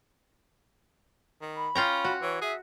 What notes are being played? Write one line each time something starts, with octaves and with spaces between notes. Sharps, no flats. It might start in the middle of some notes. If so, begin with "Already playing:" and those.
D#3
B5
C#4 F4 G5 A#5
F#4
E3 C#5
G#4 E5